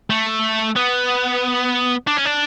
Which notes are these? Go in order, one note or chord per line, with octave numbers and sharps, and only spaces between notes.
A3
B3
D4
C#4
D4